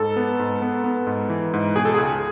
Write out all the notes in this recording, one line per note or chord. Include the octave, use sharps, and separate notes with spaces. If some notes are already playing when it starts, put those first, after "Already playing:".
Already playing: G#2 A4
B3
G#2
B3
B3
G#2
E3
G#2
B2 G#4
A4
C#2 G#4